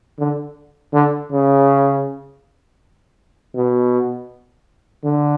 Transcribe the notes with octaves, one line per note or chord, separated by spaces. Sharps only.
D3
D3
C#3
B2
D3